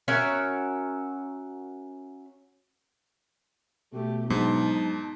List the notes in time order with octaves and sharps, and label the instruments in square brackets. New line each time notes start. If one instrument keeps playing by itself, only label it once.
[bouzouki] C#4 F#4 A#4 E5
[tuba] B2 [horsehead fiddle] A3 G4
[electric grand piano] G#2 [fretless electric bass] F#3 B3 D4 [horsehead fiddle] D#4 A5